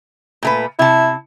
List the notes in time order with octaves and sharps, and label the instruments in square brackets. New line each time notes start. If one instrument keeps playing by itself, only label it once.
[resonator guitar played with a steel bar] A#2 A3 B4
[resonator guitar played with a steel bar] C3 A5 [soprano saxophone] E4